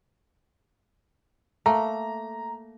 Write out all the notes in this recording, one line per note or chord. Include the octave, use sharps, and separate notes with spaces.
A3 A#3 A#5